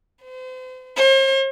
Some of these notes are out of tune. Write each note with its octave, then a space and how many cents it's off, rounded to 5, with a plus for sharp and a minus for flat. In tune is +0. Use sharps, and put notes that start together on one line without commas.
C5 -35
C5 +45